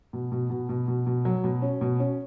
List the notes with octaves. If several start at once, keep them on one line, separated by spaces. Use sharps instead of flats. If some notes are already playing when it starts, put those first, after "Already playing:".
B2
B2
B2
B2
B2
B2
F#3
B2
C#4
B2
C#4